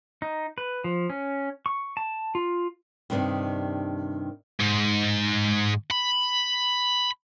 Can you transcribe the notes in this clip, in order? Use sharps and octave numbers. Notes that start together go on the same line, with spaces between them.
D#4
B4
F3
C#4
C#6
A5
F4
G2 C3 D#3 A3 D4 D#4
G#2
B5